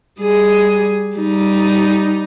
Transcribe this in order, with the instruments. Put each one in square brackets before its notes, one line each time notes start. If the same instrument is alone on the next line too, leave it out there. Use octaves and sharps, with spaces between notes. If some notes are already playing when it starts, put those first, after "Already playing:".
[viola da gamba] G3 G#4
G3 D#4